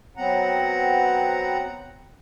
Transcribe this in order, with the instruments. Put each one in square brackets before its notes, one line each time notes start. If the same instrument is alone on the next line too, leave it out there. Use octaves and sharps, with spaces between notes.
[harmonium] F#3 B3 C4 F#5 A#5